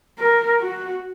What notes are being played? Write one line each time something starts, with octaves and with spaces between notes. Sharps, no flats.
A#4
F#4